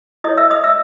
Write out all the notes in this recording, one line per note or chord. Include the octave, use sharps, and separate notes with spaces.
E4 A4 C#5 D#5 D#6
E5 E6
D#5 D#6
E5 E6